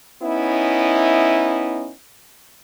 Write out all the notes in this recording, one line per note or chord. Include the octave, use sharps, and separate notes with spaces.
B3 C#4 D#4 E4